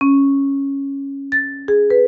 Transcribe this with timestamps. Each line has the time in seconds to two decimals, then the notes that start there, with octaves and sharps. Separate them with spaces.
0.01 C#4
1.32 A6
1.68 G#4
1.90 B4